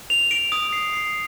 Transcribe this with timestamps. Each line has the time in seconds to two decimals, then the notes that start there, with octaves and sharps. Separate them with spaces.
0.10 F7
0.31 D7
0.52 D#6
0.73 C7
0.93 C7